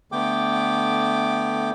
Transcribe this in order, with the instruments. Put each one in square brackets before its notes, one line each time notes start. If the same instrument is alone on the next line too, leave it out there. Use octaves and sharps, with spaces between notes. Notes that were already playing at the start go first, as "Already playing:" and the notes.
[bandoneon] D3 A3 B3 G5 D6